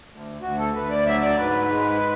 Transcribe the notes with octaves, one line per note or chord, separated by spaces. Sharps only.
D2
D2 F#4
A4
D2 B4
D5
F#3 E5
D5
G#2 B4
G#3